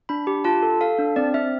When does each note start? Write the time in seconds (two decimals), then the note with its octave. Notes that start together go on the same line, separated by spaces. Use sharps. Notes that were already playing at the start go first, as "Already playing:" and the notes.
0.09 D4 B5
0.27 G4
0.45 F4 A5
0.62 A4
0.81 A4 F5
0.99 D4
1.16 C4 D5
1.34 C4 E5